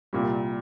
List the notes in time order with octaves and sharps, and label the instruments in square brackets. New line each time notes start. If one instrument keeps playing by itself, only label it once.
[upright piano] C2 A#2 G3